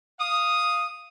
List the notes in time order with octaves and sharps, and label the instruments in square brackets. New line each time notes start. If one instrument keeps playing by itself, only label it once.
[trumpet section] F5 D#6